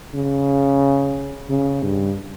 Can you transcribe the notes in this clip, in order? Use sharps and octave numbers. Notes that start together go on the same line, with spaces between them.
C#3
C#3
G2